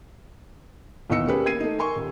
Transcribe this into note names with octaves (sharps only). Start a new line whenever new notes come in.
D#2 B2 E3 D#5 E6 C#7
A3 A#3 C#4 G4 G#4 B4
A#3 G#6 C7 D#7
A3 D#4
A#4 G#5 C6 C#6
D#1